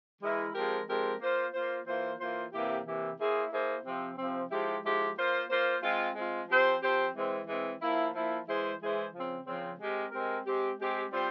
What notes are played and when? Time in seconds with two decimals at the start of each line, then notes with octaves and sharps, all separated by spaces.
0.21 E3 G#3 E4 A#4
0.55 F3 G#3 C4 G4 A#4
0.87 F3 G#3 C4 G4 A#4
1.20 A#3 F4 C5
1.53 A#3 F4 C5
1.86 E3 A#3 F4 C5
2.19 E3 A#3 F4 C5
2.52 C3 E3 A#3 E4 G4
2.85 C3 E3 A#3 E4 G4
3.18 A#3 E4 G#4 C5
3.52 A#3 E4 G#4 C5
3.85 C3 F3 C4
4.17 C3 F3 C4
4.51 F3 G#3 E4 G4
4.83 F3 G#3 E4 G4
5.17 A#3 F4 C5
5.50 A#3 F4 C5
5.82 G#3 C4 F4
6.15 G#3 C4 F4
6.48 F3 C4 G4 C5
6.82 F3 C4 G4 C5
7.15 E3 G#3 C4
7.47 E3 G#3 C4
7.81 F3 A#3 E4
8.14 F3 A#3 E4
8.47 E3 G#3 E4 G#4 C5
8.80 E3 G#3 E4 G#4 C5
9.13 C#3 F3 C4
9.45 C#3 F3 C4
9.79 G#3 C4 G4 A#4
10.11 G#3 C4 G4 A#4
10.45 G#3 C4 G4
10.79 G#3 C4 G4
11.11 G3 C4 F4 C5